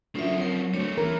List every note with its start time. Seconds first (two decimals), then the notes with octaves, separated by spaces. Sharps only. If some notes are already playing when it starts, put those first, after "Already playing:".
0.15 D2 F#3 C#4 F4 A#4 E5
0.38 F2 A#4 C#5
0.74 D2 G3 A3 C#5
0.98 D#1 E3 A#4